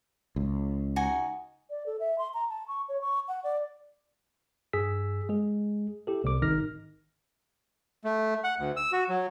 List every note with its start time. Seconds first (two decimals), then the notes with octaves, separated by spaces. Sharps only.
0.36 C#2
0.96 D#4 F#4 G#5
1.70 D5
1.86 A4
2.00 E5
2.18 C6
2.34 A#5
2.49 A5
2.68 C#6
2.89 C#5
3.01 C#6
3.28 F#5
3.44 D5
4.73 G2 G#4 E6 B6
5.29 G#3 G#4
6.07 E4 G4 A4
6.24 C2 C3 G3 D6
6.42 G#1 D#3 D#4 F6 A#6
8.04 A3
8.44 F#5
8.59 D2
8.77 E6
8.92 F#4
9.09 F#3